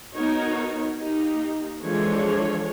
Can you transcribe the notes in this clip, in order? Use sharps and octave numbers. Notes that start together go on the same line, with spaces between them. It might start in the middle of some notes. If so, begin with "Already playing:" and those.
B3 D#4 F#4 A#4 C#5
A#3 D#4 G4
E3 F3 G#3 D4 A4 C#5